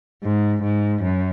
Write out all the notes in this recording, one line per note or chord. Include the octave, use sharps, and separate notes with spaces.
G#2
G#2
F#2